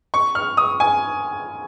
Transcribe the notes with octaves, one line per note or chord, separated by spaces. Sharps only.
C#6
F6
D#6
G#5